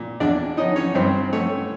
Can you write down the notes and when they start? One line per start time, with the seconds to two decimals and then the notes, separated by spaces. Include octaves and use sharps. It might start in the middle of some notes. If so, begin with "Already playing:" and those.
Already playing: A#2
0.20 E2 D4 D5
0.57 C#4 D#4 D#5
0.76 C#4 C#5
0.95 G2 C4 C5
1.33 A3 C#4 C#5